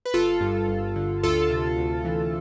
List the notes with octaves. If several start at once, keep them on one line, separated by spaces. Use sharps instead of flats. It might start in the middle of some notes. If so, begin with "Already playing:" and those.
B4
G1 F4 A4
G2
G1
D3
D2 F4 A4
C3
D2
E3